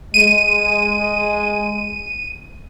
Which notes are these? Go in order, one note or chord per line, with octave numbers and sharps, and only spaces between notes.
G#3 D#7